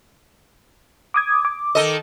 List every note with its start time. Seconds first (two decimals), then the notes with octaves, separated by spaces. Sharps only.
1.14 D6 D#6 G#6
1.45 D6
1.75 D#3 A4 D#5